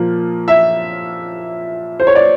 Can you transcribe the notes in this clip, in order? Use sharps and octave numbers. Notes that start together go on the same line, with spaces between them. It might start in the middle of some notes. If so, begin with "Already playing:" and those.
Already playing: A#2 F3 A#3
E5
C5
C#5
D5